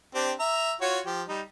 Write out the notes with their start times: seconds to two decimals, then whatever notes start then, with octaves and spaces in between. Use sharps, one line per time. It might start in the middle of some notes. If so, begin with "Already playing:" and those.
0.15 C4 D4 G4
0.39 E5 A#5
0.81 F4 F#4 C#5
1.06 F3 G4
1.28 G3 D#4